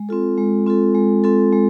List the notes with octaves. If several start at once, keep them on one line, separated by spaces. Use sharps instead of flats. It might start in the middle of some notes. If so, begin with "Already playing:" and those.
Already playing: G#3
C4 F4 A4
G#3
C4 F4 A4
G#3
C4 F4 A4
G#3